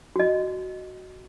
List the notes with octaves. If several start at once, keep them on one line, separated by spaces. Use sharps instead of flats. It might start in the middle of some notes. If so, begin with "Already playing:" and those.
F#4 D#5